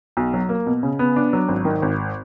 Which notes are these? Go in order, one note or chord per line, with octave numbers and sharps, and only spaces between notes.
B1
F#3
A#3
B2
C#3
B3
D4
F#3
G#1
D#3
G#1